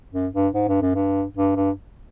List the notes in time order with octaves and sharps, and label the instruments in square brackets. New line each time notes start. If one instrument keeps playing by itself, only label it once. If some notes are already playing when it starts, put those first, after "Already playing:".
[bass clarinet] F#2
G2
G#2
G2
F#2
G2
G2
G2